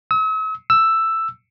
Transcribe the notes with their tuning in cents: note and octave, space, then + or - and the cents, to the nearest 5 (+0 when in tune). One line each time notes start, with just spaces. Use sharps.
E6 -45
E6 +5